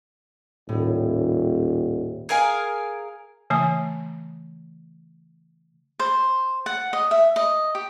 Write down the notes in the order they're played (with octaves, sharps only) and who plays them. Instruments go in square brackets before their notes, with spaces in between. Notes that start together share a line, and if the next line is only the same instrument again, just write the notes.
[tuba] D#1 [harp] A2
[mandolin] G#4 A#4 F5 G#5
[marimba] C#3 E3 A3 G#5 D#6
[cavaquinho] C5
F#5
D#5
E5
D#5
G4